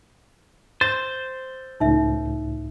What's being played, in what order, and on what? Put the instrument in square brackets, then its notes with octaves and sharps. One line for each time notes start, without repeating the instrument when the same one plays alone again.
[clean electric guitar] C5 [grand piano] A6
[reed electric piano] C#2 A2 [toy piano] D#4 E5